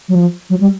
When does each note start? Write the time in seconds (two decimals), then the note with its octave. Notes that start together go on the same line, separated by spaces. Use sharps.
0.09 F#3
0.15 F3
0.50 F#3
0.60 G3